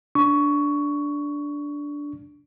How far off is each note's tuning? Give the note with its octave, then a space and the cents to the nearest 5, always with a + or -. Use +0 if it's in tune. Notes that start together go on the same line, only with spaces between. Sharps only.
D4 -10 C#6 +15